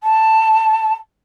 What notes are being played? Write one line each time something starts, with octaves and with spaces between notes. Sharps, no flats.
A5